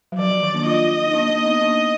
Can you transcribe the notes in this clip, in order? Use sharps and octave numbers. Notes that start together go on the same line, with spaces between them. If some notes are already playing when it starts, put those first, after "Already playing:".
F#3
F3 D5
F3
D#3
A#3 D4
D4 F4 D#5
D#4
A#3 D4
A#3 D4
B3 D#4
A#3 D4